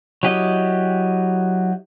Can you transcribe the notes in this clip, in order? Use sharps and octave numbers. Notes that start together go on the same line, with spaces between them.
F#3 E4 G4 D#5